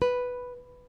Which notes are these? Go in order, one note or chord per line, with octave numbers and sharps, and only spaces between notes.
B4